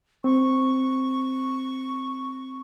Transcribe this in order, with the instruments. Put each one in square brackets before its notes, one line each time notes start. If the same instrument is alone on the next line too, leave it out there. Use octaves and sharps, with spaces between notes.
[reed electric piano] C4 [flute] C#6